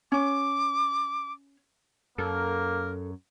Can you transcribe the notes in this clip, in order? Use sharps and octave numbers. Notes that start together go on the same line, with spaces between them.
C#4 D6
F#2 A#3 A4 A#4